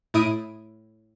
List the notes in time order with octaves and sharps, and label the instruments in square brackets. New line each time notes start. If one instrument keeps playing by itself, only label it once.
[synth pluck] A2 E4 D#6 D7 D#7